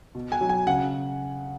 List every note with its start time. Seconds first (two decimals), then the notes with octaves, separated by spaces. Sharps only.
0.15 B2
0.32 G#5
0.41 F#3
0.49 G#5
0.66 C#3 F#5